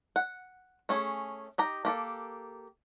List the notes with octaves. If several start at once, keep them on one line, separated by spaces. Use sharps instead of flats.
F#5
A3 C#4 G#4
D#4 G4 A#5
A#3 G4 A4